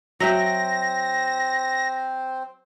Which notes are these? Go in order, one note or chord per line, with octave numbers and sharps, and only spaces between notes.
F#3 C4 C5 E5 G5 A#6